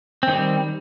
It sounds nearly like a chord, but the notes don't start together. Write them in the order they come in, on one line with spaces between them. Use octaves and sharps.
C4 D#3 G3